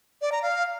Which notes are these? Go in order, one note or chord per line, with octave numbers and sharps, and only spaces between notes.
D5
A#5
F5